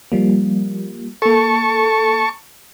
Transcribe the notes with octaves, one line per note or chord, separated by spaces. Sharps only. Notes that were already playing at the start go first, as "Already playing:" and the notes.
F3 G3 A#3
A#3 A4 A5 C#6